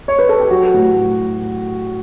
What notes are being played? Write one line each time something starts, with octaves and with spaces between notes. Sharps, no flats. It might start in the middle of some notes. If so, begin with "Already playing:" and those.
C#5
B4
A4
G4
F#3 F#4
A2